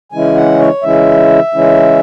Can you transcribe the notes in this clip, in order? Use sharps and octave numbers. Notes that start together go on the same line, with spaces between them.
C#3 E3 G#3 C#4 E4 G#5
F#5
C#5
C#3 E3 G#3 C#4 E4 E5
C#3 E3 G#3 C#4 E4